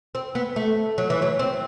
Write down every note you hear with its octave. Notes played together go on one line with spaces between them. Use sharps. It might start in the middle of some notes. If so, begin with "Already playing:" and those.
C4
B3
A3
F#3
E3
F#3
C4